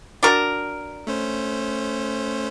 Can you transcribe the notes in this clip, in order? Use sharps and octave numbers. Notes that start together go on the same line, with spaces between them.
D4 F#4 A#4
A3 C#4 C5